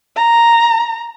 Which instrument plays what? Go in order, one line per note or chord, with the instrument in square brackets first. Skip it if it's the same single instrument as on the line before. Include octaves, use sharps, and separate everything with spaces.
[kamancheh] A#5